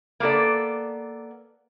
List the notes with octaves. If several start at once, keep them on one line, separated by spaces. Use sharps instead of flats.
A#3 B3 A4 D5